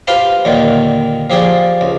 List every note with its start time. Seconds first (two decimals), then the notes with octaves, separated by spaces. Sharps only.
0.07 F4 G4 B4 C5 G5 B5
0.45 D#2 A#2 D3 D#3
1.30 F3 G4 G#4 D5
1.81 C#2